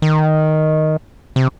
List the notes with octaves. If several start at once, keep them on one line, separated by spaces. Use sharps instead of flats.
D#3
C3